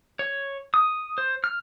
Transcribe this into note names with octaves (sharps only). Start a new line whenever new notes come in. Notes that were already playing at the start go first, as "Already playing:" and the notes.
C#5
D#6
C5
F6